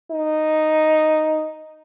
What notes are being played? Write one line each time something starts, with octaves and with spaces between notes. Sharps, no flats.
D#4